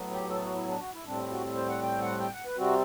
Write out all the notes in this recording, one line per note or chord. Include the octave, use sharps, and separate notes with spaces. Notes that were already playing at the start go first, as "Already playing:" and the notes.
Already playing: A2 F#3 B3
G4
A4
F#4
E4
D4
F#4
E4
A2 G3 C4 D4
E4
F#4
C5
F#5
G5
F#5
G5
F#5
B4
C3 G3 C4 F#4